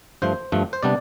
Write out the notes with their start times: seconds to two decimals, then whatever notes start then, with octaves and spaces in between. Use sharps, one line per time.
0.22 G2 F3 A3 C5
0.52 G2 F3 A3
0.73 C5
0.83 C3 G3 B3 D4 D5